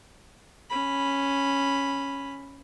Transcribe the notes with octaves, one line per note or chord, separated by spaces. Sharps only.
C#4 B5